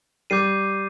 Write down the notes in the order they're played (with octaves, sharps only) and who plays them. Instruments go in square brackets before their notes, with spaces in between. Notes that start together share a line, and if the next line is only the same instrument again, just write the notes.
[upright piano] G3 [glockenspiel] D6 G6 C7 D#7